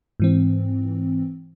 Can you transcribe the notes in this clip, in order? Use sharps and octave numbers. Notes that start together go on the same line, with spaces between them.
G#2 E3 C4